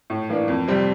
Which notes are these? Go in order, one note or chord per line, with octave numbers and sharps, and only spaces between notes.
A2
E3 A#3 D4
F2
C3 G3 C4